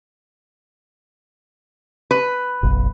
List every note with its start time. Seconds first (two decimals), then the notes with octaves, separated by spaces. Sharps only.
2.11 B4
2.63 F#1 B1